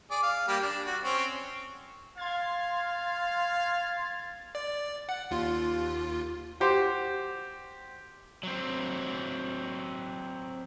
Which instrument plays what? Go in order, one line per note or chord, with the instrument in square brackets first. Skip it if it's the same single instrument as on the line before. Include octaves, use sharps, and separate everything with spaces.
[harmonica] G#4 D5
F5
G3 A#3 G4
D4
F#4
C4 C#4 C#5
[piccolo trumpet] F5 [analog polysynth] C6 G#6 A6
[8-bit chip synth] D5
F#5
D#2 F4
[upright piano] F#4 G4 C5
[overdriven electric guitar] F#3 C4